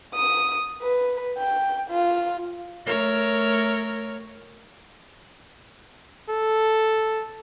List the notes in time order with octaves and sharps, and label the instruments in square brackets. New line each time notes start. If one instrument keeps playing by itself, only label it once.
[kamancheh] D#6
B4
G5
F4
[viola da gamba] A3 A#4 C#5
[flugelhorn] A4